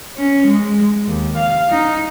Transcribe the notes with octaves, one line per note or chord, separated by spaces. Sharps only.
C#4
G#3
D#2
F5
D#4